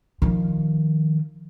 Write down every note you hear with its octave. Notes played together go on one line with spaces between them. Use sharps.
D#3 F3